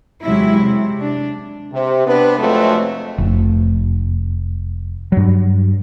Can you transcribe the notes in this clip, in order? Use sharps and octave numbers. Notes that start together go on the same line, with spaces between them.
E2 C3 F#3 G#3 E4
C3
D4
C3
B3 C4 D4 B4
F2 C3 F#3 G#3 A3 C4
F1
G2 F#3